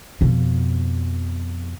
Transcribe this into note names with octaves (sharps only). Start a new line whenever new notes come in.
F2 B2